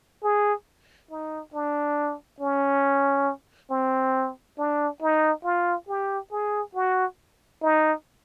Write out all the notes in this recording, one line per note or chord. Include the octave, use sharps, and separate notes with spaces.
G#4
D#4
D4
C#4
C4
D4
D#4
F4
G4
G#4
F#4
D#4